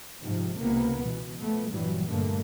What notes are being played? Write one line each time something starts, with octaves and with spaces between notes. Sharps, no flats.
G#2 C3 F3
C#2 C3 A#3 B3
B2 E3
F3 A3 B3
G2 A#2 E3 F#3 G3
G2 D3 A3 A#3